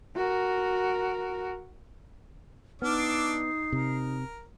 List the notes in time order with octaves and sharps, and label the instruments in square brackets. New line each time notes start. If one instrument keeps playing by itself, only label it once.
[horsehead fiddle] F#4 A#4
[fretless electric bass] B3 [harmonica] D4 D6 E6 [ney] D#4 [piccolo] F6
[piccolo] C7
[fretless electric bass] C3 [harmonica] A#4